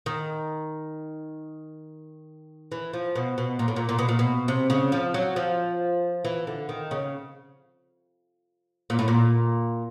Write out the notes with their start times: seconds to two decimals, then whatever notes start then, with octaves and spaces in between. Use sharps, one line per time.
0.06 D#3
2.72 E3
2.93 F3
3.15 B2
3.38 B2
3.59 A#2
3.68 A2
3.76 A#2
3.89 A#2
3.99 B2
4.09 A#2
4.19 B2
4.48 C3
4.70 C#3
4.92 F3
5.14 F#3
5.36 F3
6.25 E3
6.47 D3
6.69 D#3
6.91 C#3
8.90 A#2
8.99 A2
9.08 A#2